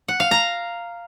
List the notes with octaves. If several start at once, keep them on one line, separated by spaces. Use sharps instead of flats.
F#5
F5
A#5